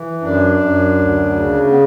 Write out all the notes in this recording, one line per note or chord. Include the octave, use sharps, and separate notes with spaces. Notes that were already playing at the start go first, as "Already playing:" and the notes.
Already playing: E3
F#2 D4
F#2
D2
C#3
B3